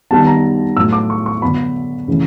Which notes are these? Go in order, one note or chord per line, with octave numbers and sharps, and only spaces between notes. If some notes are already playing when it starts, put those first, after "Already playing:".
D#3 G3 B3 A5
A#5
A2 F#3 A3 E6
D6
C#6
C#6
D3 F#3 B3 B5
C#3 E3 A3